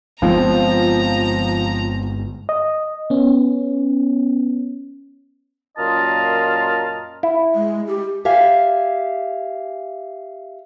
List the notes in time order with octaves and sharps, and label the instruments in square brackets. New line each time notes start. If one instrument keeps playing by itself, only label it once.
[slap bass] G1 G#3 B3 [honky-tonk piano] F3 [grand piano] C4 [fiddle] A#5
[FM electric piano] D#5
B3 C#4
[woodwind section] F#2 A#2 F4 A#4 D#5 A5
[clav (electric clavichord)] E4
[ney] G#3
G4
[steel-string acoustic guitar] G4 E5 F5 G#5